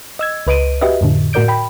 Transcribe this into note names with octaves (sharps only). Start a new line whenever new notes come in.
D#5 E6 G#6
C#2 B4 D#5 D7 D#7
F#4 G4 B4 D#5 E5
F2 A2 D3
A2 F#4 A#4 D5 G6 D7
G5 B5